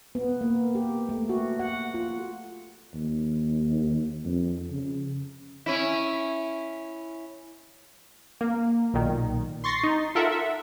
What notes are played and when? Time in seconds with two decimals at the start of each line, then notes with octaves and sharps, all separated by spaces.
0.15 B3
0.41 A#3
0.75 G4
1.09 A3
1.29 F#4
1.59 F#5
1.94 F4
2.94 D#2
4.25 F2
4.72 C#3
5.66 C#4 E4
8.41 A#3
8.94 B1 A#2 D#3
9.64 C6 C#6 A6 A#6 C7
9.83 D#4
10.15 F4 A4 A#4 E5 F#5
10.32 E5